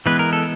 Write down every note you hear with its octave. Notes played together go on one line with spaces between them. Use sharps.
E3 G#3 B3 B4
A#4
A4